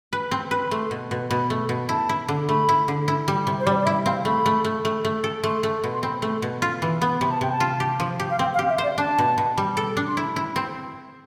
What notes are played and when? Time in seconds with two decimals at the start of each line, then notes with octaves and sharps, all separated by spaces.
0.13 B4
0.31 C4
0.51 B4
0.63 B5
0.71 A3 C6
0.91 B2
1.11 B2
1.30 B2 B5
1.50 A3
1.69 B2
1.89 E4 A5
2.09 E4
2.28 D3
2.48 A3 B5
2.69 E4
2.88 D3
3.08 E4
3.28 G3
3.47 C3
3.60 C5
3.66 G3 D5
3.80 D5
3.86 E4 E5
4.06 C4 F5
4.25 A3 B5
4.46 A3
4.65 A3
4.85 A3
5.05 A3
5.24 A4
5.44 A3 C6
5.63 A3
5.84 B2
5.93 C6
6.03 C4 B5
6.22 A3
6.42 B2
6.62 F4
6.82 E3
7.02 B3
7.21 C3 B5
7.31 A5
7.41 C3 G5
7.52 A5
7.60 F4
7.80 G4
8.00 F3
8.20 G4
8.30 F5
8.39 C4 G5
8.54 F5
8.59 G4
8.69 E5
8.78 C5 D5
8.98 D4 A5
9.18 B2
9.38 B2
9.58 G3
9.77 A4
9.97 D4
10.08 C6
10.17 E4 B5
10.36 E4
10.56 C4